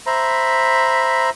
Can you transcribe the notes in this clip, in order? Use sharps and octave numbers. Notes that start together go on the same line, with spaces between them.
C5 E5 A#5 B5